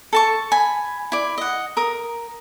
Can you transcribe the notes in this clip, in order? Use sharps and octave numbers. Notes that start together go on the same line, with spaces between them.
A4 A5 C#6
G#5 B5
E4 D5
D#5 F#5
A#4 D#6